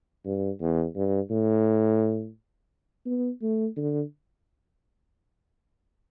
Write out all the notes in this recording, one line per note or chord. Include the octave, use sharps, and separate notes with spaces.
G2
E2
G2
A2
B3
A3
D3